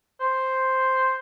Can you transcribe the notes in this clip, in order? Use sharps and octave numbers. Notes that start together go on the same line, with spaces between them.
C5